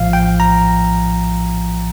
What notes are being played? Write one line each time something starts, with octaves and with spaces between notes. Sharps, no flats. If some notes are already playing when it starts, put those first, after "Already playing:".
Already playing: A#1 A2 F3 F5
G5
A#5